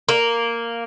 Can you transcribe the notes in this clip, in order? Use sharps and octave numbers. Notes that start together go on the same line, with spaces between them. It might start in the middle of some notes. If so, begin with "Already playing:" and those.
A#3